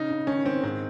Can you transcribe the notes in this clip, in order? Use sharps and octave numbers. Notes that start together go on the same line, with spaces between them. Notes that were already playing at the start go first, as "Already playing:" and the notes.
Already playing: C#3 D#4
C#3
D#3 C#4
D#3 C4
G#2 C4